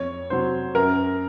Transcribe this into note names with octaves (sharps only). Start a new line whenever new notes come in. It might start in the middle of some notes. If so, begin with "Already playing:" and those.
Already playing: F2 C#5
C3 F#3 C5
F#2 A#4